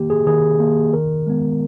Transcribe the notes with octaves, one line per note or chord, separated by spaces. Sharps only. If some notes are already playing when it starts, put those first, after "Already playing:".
Already playing: D#3 A#3 G4
G#4
D#3 G#4
A#3
D#3 A#4
G#3 B3